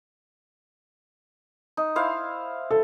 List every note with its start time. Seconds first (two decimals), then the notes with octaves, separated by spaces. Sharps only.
1.77 D#4
1.96 E4 C5 F5
2.71 A4